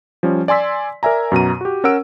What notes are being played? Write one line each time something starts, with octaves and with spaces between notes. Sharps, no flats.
F3 G3 C#4
D5 G#5 C6 E6 B6
A#4 D5 E5 G#5 A#5
F#2 B2 A#5 D#7
F#4 G4
C#4 A#4 F#5 E6 D7